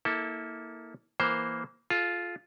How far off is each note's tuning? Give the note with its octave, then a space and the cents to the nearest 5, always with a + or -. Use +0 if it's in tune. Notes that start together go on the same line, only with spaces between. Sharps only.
A#3 +0 E4 -30 A4 +0
E3 +0 A#3 +5 C5 +0
F4 +0 A4 -45